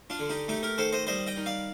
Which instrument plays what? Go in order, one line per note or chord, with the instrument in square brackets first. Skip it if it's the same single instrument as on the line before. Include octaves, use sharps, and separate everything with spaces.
[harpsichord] D4 F4
D3
D#4 G4
A3 D#4 G4
G4 A#4
D#3 A4 C5
C5 D#5
G3 C5 D#5
D#5 G5
D#3
D5 F5